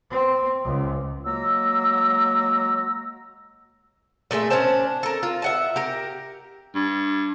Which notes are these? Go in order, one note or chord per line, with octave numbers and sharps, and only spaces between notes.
C4
C#2
F#3 G#3 A#3 A#5 E6
A#2 A3 G#4 E5
C#4 D4 C5 A5
A4 A#4
F4
E5 F#5 A5
G4 A#4
G2